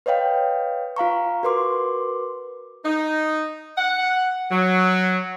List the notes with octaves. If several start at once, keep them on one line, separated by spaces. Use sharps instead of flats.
B4 C#5 D#5 F5 G5
F4 F5 A#5 C#6
F#4 A#4 B4 C6 D6
D#4
F#5
F#3